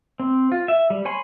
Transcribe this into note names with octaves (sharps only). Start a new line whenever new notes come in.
C4
F4
E5
G3
C#5 G#5 B5 C6